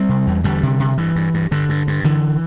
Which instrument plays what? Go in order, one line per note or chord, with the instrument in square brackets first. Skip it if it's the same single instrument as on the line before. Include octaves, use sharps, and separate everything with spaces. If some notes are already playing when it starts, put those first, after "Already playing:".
Already playing: [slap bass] G3 C4
C3
E2
E2 D3 G3
C3
C3
G2 E3
G2
G2
G2 D3
G2
G2
D3 E3